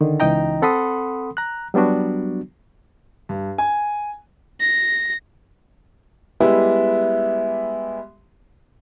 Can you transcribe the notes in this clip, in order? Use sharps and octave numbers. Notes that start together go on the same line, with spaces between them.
D3 D#3
C#2 E3 D#4 D#5 G5 A#5
C4 A4 F#5 B5 C6 D#6
A#5 F#6
F#3 G3 B3 D4 F#4
G2
G#5
A#6
G3 G#3 B3 E4 G4